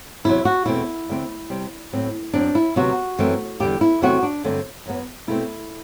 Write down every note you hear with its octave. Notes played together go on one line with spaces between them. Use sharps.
E2 C3 F#3 E4
F#4
E2 B2 A3 C4 E4
D2 D3 A3 C4
C3 G3 C4
A2 F#3 C4
F#2 F#3 C4 D4
E4
D2 C3 F#3 B3 F#4
F#2 E3 A3 C4
E2 D3 G3 G4
E4
E2 C3 F#3 A3 C4 F#4
D4
G2 D3 F#3 A3 C4
F#2 F#3 B3
B2 A3 C4 E4